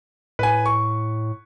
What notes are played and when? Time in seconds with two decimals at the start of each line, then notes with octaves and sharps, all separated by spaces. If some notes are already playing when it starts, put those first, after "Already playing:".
0.39 A2 B4 G#5
0.66 C#6